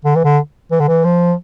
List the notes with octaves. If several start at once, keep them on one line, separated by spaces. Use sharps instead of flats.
D3
E3
D3
E3
D3
E3
F3